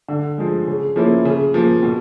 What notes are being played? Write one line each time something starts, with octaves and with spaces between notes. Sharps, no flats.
D3
F3 G#3
C#3
F3 A#3 C#4 E4
C#3
F3 A#3
B2